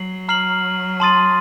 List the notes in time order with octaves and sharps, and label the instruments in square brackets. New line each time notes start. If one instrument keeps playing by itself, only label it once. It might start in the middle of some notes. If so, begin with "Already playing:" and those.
Already playing: [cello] F#3 [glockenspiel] C7 F#7
[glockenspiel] A#5 F6 C7 F#7
A5 C6 D#6 A6 D#7